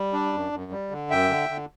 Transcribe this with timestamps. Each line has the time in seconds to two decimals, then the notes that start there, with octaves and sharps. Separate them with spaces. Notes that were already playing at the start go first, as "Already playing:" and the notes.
Already playing: G3
0.13 D4
0.33 F#2
0.52 F#2
0.71 G3
0.91 D3
1.10 F#2 E5 G5
1.29 D3
1.49 D3